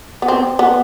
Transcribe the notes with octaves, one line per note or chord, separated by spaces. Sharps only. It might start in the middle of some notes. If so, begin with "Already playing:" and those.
B3
C4
B3